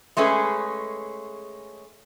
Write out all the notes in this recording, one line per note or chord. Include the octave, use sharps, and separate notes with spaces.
G#3 A3 C#4 G#4 B4